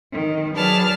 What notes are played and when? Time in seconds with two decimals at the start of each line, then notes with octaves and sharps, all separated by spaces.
0.12 D#3
0.55 F#3 G#4 B4 D5 A5 F6